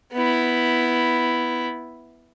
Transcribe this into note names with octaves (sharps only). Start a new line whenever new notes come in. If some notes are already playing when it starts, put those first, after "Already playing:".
B3 E4